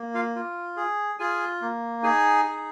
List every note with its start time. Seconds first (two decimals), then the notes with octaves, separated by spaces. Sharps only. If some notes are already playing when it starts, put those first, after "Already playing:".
Already playing: A#3
0.14 F4 F5
0.36 F4
0.77 G#4
1.19 F4 G#4 G#5
1.61 A#3
2.03 D#4 G#4 G#5
2.45 G#4